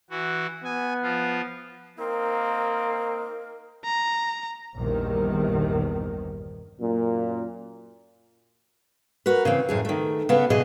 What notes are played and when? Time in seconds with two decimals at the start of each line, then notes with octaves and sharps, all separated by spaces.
0.10 E3 F#4
0.64 B3 G#5
1.03 F3 F4
1.99 A#3 C4 D#4 A#4
3.85 A#5
4.76 A#1 E2 G2 D#3
6.80 F#2 A#2
9.26 F#4 A#4 B4
9.45 C#3 E3 C4
9.69 F#2 A2 G#4
9.85 D#3 A3
10.29 C#3 B3 B4
10.50 E2 B2 D3 F#3 G#4 D#5